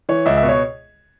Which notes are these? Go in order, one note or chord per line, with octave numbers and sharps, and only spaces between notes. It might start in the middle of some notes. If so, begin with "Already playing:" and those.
E3 C#5
C#2 E5
E5
B2
C#5